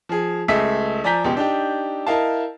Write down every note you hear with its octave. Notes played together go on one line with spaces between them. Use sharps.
F3 G#4
C#2 A3 G#4 E5 E6 B6
F3 D5 G#5 A#5 G6 B6
C#2 B2 G4
D4 D#4 G4
E4 A#4 D#5 F5 A5